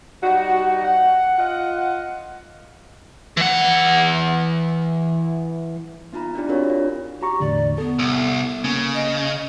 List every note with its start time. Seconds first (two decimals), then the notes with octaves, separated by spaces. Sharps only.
0.22 G3 D#4 F#4
0.84 F#5
1.38 F4 D#5 F#5
3.37 E3 F#5
6.13 B3 D#4 F4 A#5 B5
6.35 D4 E4 F4 G4 D5
6.49 C4 D4 F#4 G#4 A#4 C#5
6.69 D4 F4
7.22 F#4 G4 A#5 C#6
7.40 E2 A2 D3 D5
7.78 B3 A4
7.99 C2
8.64 C#3 A#3
8.94 D#5